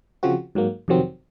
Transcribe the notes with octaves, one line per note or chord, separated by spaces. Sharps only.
C#3 F3 C4 F#4
G#2 F#3 A#3
F2 C3 D#3 F#3 C4